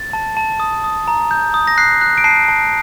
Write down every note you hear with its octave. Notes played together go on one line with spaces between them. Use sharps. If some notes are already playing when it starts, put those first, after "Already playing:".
Already playing: A6
A5
A5
D#6
D#6
A#5
G6
D#6
A#6
F#6 C7
F#6
D7
A5 C7
A5